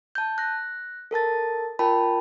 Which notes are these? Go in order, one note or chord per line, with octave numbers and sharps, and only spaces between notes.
A5 G6
F#6 A#6
A4 A#4 A5 A6
F4 A#4 G5 A5 B5